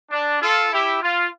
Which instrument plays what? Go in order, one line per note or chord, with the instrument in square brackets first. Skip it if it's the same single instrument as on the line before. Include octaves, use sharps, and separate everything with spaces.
[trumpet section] D4
F4 A4
E4 G4
F4